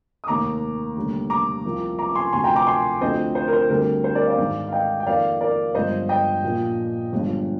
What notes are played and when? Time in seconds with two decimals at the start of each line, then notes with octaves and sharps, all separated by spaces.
0.24 D#6
0.27 F1 D#2 D#3 A#5 D6
0.96 F1 D#2 D3 G3
1.30 A#5 D6
1.64 C2 C3 F3 A#3
1.99 A#5 D6
2.09 D6
2.15 G#5 C6
2.32 D2 C3 F3 G#5 C6
2.44 G5 A#5
2.56 A#5 D6
2.67 G#5 C6
3.01 D2 D3 F3 C4 C5 D#5
3.35 C5
3.48 A#4
3.53 C5
3.70 D2 D3 G3 C4 A#4
4.04 C5
4.15 A#4 D5
4.27 D5 F5
4.38 G#1 G#2 D#3 G#3
4.68 F5
4.72 D#5 G5
5.00 G5
5.06 F2 D#3 A#3 D5 F5
5.41 A#4 D5
5.75 G1 G2 F3 G#3 C5 D#5
6.09 D#5 G5
6.43 A#1 A#2 F3
7.12 G1 G2 F3 G#3